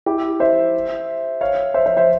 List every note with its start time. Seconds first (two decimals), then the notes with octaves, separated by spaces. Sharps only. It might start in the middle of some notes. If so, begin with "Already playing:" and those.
0.06 E4 G4
0.40 C5 E5
1.41 C#5 F5
1.74 C5 E5
1.86 C5 E5
1.97 C5 E5